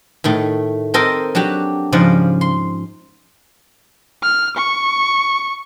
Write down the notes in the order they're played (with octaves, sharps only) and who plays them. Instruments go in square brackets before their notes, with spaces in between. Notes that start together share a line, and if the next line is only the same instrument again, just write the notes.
[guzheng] A2 D#3 A3
C4 A4 A#4 D#5 G5
F#3 D4 F#4 G4
G#2 C#3 F3 D5 D#5 F#5
C6
[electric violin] F6
C#6